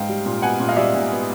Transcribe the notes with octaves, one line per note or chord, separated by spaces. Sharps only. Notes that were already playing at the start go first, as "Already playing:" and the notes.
Already playing: G#2 F5 G5
G3
A#2
B3 F#5 G#5
A#2
D#5 F5
G3 D5 E5
A#2
B3